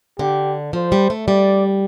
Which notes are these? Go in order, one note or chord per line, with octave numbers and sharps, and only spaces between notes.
D3 G4
F3 C5
G3
A3
G3 D5